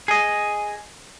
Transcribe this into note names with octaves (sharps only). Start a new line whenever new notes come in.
G#4 D#5